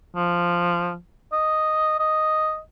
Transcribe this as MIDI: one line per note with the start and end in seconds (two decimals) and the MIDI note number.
0.16 0.96 53
1.32 1.99 75
1.99 2.59 75